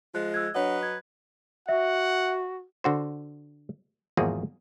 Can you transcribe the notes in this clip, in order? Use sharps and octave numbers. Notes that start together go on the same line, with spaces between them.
F3 G#3 F4 F#6
E6 F#6 G#6
F#3 D4 B4 C#5 D#5 F#5
G#6
F#4 E5 F#5
D3 F#4 C5
G#1 E2 F3 A#3 F#4 G#4